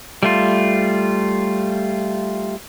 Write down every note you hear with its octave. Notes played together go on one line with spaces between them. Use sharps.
G3 A3 F4